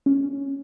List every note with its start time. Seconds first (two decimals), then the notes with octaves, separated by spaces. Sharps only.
0.06 C#4